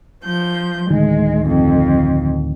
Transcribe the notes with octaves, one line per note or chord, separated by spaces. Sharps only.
F3 G6
D1 D2 D#3 G#3
F2